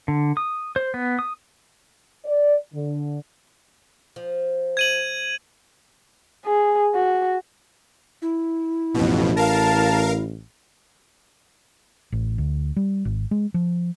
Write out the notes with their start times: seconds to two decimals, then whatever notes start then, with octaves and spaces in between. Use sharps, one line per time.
0.08 D3
0.37 D#6
0.76 C5
0.94 B3
1.19 D#6
2.25 D5
2.73 D3
4.16 F3
4.77 G#6 D#7 F#7
6.46 G#4
6.95 F#4
8.22 E4
8.94 A1 F2 B2
9.37 A#4 F5 A5
12.12 A1
12.38 D2
12.76 G3
13.05 G#1
13.31 G#3
13.54 F3